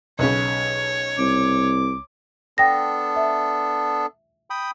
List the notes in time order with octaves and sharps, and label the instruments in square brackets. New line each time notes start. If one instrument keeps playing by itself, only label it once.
[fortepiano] B1 C#3 [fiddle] C#5
[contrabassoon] C2 [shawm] D6
[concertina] B3 D4 A4 [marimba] G5 A#6
[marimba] E5
[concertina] G5 B5 D#6